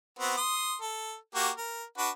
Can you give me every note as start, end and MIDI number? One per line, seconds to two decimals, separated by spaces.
0.19 0.37 59
0.19 0.37 60
0.19 0.37 66
0.37 0.76 84
0.37 0.76 87
0.81 1.15 69
1.35 1.50 58
1.35 1.50 66
1.35 1.50 67
1.58 1.84 70
1.98 2.10 62
1.98 2.10 66
1.98 2.10 71